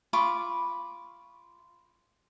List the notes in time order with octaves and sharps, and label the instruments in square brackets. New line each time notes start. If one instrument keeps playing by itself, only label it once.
[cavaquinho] F4 B5 C#6 D6